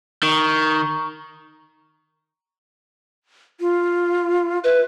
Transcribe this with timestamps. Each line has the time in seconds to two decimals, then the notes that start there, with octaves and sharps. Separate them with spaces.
0.23 D#3 A#5 C#6
3.61 F4
4.64 B4 E5